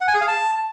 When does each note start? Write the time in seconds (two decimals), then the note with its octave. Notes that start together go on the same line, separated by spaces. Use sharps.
0.01 F#5
0.08 G#5
0.14 G#4
0.21 F5
0.28 A5